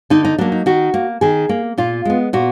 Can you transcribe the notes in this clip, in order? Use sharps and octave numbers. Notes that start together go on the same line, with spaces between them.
D3 D#4
D#4
F#3 A#3 D4
D#4
D#3 F#4
A#3
D#3 G#4
A#3
A#2 F4
G#3 B3
A#2 F#4